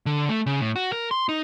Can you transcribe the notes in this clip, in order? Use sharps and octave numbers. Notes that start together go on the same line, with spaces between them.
D3
A3
C#3
A2
F#4
A#4
C6
D#4